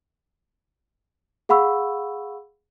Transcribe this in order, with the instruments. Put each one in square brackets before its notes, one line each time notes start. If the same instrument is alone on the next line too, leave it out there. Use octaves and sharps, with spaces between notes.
[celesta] G#4 F5 F#5 B5 C#6 E6